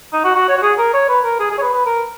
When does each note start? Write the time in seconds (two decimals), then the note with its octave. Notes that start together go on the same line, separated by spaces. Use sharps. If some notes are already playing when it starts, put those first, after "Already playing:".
0.13 D#4
0.25 F#4
0.36 F#4
0.48 C#5
0.58 F#4
0.62 G#4
0.78 A#4
0.94 C#5
1.08 B4
1.24 A#4
1.40 G#4
1.51 G#4
1.58 C#5
1.62 B4
1.73 B4
1.86 A#4